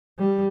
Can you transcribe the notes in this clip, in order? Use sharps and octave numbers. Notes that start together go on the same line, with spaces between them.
G3